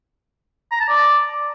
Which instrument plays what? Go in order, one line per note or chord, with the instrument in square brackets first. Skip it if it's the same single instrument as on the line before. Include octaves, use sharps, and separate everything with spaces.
[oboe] A#5
A5
D5